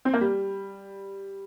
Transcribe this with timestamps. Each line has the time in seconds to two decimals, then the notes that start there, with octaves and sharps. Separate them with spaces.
0.05 C4
0.14 A#3
0.21 G3